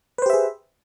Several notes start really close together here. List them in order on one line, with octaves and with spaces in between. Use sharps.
B4 C5 G4 E5 G#4